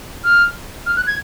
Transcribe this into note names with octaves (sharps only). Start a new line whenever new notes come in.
F6
F6
F#6
G#6